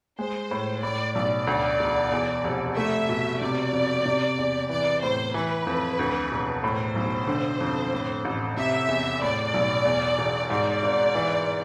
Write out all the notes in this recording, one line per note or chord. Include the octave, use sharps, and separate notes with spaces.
G#3 C5
A2
A2 D5
B1 D5
D2
E1
E2
F1
A3 E5
B2
C3 D5
F2
C3
E2
E3 D5
A2 C5
E3 B4
F2
D2
E1
A2 C5
B1
D3
F2
A2
A1
C3 E5
E2
A2 D5
B1
E2
E1
G#2 D5
G#1
E3